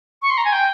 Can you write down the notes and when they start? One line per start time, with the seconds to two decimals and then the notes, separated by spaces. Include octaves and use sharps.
0.22 C#6
0.30 C6
0.37 A#5
0.45 G#5
0.52 G5